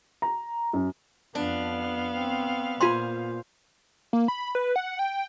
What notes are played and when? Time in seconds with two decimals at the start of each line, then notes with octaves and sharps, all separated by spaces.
0.22 A#5
0.73 F#2
1.35 F2 B3 D4 F5
2.16 C4
2.81 A#2 F4 C5 G#5 B5 C6
4.13 A#3
4.28 B5
4.55 B4
4.76 F#5
4.99 G5